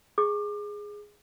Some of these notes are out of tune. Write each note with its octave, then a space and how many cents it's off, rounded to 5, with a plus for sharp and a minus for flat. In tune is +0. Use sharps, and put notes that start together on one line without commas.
G#4 +0 D6 +35